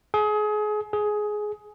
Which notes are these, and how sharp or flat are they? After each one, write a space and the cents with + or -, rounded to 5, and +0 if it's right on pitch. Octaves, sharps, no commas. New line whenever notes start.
G#4 +30
G#4 +15